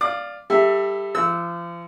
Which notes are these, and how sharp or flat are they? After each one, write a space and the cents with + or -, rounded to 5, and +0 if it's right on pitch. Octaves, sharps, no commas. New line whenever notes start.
D5 +0 F5 +0 D6 +45
G3 +20 A4 +30 E5 +0
F3 -35 E6 -15